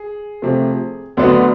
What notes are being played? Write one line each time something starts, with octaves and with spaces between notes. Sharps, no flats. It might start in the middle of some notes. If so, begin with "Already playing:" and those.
Already playing: G#4
C3 F3 A3
D2 D3 F#3 B3 D4